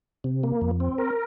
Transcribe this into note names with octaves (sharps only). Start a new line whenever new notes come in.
C3
A#3
F2
C4
A#4